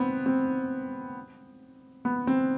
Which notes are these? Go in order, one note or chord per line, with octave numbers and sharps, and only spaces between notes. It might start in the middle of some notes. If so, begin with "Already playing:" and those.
Already playing: B3 C4
C4
B3
C4